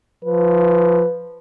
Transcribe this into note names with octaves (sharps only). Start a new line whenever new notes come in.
F3 B4